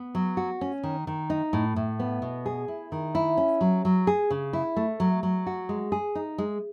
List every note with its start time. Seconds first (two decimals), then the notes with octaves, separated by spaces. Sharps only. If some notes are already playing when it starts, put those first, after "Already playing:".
Already playing: B3
0.15 F#3
0.37 F#4
0.61 C#4
0.83 D#3
1.07 D#3
1.30 D#4
1.53 A2
1.76 A2
2.00 B3
2.22 B2
2.46 G#4
2.68 E4
2.92 D#3
3.15 E4
3.37 C#4
3.61 F#3
3.85 F#3
4.07 G#4
4.30 C#3
4.53 E4
4.76 A3
5.00 F#3
5.23 F#3
5.47 F#4
5.69 G#3
5.92 G#4
6.15 D#4
6.38 G#3